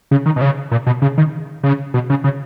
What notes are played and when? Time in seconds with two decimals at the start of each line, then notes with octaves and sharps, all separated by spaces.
0.11 C#3
0.26 D#3
0.36 B2
0.41 C#3
0.71 A#2
0.87 B2
1.02 C#3
1.18 D#3
1.63 C#3
1.94 B2
2.10 C#3
2.24 C#3